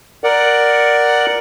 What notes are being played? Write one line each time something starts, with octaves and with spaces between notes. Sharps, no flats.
A#4 D5 F#5